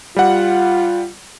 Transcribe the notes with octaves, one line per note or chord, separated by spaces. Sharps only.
G3 F4 F#5